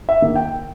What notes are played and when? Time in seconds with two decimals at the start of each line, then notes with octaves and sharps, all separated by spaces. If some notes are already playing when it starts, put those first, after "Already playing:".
0.09 E5
0.22 D#3 A#3
0.35 G5